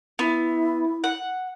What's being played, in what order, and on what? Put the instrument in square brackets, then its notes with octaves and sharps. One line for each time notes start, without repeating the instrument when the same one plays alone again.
[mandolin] B3 [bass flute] E4
[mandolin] F#5